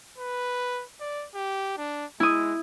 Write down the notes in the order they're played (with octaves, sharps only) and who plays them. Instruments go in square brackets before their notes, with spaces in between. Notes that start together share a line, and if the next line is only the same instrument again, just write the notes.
[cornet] B4
D5
G4
D4
[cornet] G#3 [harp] E4 D#6